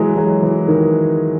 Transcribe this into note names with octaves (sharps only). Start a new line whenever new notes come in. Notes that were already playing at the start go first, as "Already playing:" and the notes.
Already playing: E3 F#3 G#3
F#3
E3
D#3